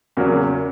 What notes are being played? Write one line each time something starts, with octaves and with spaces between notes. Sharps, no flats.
E2 C#3 F#3 A#3